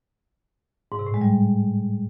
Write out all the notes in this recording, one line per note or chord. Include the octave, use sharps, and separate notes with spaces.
G#2
C3
A2
G#3
G3